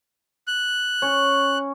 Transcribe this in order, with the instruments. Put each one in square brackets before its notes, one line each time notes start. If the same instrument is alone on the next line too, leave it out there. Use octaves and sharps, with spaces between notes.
[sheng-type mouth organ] F#6
[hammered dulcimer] C#4 C#5